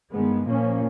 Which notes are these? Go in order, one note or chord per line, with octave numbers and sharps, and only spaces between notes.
G2 D#3 G#3 B3
A#2 F3 A#3 C#4